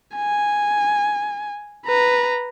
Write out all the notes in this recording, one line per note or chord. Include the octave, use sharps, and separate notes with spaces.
G#5
B4 A#5